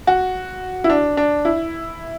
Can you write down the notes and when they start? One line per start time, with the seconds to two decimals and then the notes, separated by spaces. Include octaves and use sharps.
0.07 F#4
0.84 E4
0.90 D4
1.17 D4
1.45 E4